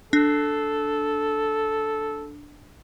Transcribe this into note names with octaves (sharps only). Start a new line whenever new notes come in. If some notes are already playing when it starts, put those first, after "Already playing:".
D4 A4